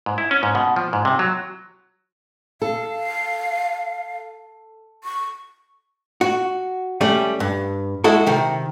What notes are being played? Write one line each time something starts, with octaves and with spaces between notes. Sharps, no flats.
G#2
E4
C#4
G#2
B2
F3
G#2
C3
F#3
A4 F5
C#6
F#4
G3 A3 C#4
G2
G#3 E4 F#4 A4
C3 D#3